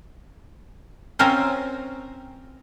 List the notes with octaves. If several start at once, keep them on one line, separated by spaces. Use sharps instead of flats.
C4 C#4 F4 A#4 C5